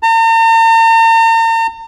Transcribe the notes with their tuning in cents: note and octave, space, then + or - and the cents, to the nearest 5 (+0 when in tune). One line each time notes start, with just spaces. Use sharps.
A#5 -45